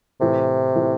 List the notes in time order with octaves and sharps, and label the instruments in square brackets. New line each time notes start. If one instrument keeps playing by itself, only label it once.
[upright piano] A2 E3 A3 [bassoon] C3
[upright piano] A2 E3 A3